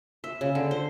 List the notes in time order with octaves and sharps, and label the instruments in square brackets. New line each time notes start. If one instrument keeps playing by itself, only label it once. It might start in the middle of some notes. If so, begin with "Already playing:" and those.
[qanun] E5
C#3
D3
C5